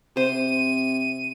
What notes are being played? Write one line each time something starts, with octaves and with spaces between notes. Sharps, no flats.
C3 C5 D#7